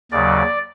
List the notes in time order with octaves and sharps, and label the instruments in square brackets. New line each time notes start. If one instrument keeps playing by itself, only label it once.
[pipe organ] D#2 C#3 F#3 D5